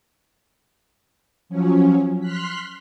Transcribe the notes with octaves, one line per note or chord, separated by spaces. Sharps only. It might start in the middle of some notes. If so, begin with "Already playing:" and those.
F3 F#3 C#4
C6 F6 F#6 B6